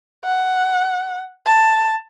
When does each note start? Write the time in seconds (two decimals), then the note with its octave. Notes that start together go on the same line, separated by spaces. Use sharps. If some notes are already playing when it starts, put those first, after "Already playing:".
0.25 F#5
1.46 A5